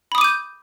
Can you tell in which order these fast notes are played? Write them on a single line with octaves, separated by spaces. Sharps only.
B5 D#6 D6 D#7 G6